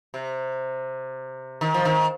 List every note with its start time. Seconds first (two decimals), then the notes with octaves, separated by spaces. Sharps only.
0.14 C3
1.61 D#3
1.74 F3
1.85 D#3